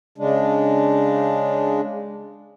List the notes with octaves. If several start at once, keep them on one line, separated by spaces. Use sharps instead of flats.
C#3 G#3 D4